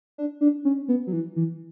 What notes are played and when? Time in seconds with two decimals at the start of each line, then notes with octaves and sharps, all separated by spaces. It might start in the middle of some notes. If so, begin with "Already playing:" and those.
0.18 D4
0.41 D4
0.65 C#4
0.88 B3
1.07 F#3
1.13 E3
1.36 E3